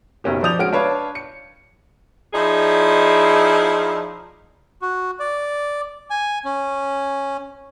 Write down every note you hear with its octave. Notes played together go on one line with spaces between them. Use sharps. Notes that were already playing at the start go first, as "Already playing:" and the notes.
F#1 B1 C#4 G4
F3 D5 D#6 G6 F7
G#3 C#4 F#4 F6 D7
D4 B4 C#5 F5 A5
C#7
F3 D#4 E4 G#4 D5
F#4
D5
G#5
C#4